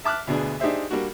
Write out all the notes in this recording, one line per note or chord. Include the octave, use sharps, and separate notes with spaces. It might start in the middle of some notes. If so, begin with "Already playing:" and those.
E5 A5 D6 F6 F#6
D2 B2 D4 G#4
D4 D#4 G4 G#4 C5 E5
G3 A#3 D4 F#4